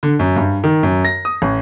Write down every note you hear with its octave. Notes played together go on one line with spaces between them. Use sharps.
D3
F#2
G2
D#3
F#2
A#6
D#6
A1